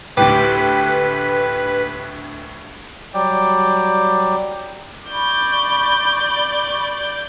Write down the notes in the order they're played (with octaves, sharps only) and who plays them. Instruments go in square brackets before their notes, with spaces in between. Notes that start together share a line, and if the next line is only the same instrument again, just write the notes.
[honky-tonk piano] D2 A2 [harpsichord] G4 [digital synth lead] B4
[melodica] F#3 G3 D5 G5
[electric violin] D5 G6 [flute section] B5 C#6